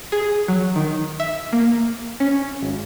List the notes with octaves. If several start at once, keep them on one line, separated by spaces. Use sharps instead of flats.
G#4
F#3
D#3
E5
A#3
C#4
G#1